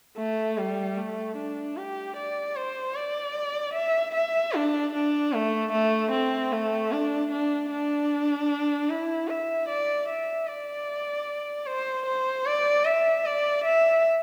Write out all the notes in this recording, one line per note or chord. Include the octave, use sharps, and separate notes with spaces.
A3
G3
A3
D4
G4
D5
C5
D5
E5
E5
D4
D4
A3
A3
C4
A3
D4
D4
D4
E4
E5
D5
E5
D5
C5
C5
D5
E5
D5
E5